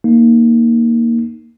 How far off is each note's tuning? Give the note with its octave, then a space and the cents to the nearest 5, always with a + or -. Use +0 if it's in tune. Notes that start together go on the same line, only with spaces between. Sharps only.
A#3 -5 D#4 -5